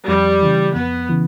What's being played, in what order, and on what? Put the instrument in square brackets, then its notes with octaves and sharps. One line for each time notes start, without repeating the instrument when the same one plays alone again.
[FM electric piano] F2 [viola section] G3
[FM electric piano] C#3 E3
[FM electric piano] F2 [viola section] B3
[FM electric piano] C#3 E3